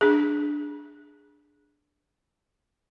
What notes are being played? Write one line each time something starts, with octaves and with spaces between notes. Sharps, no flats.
D4 G#4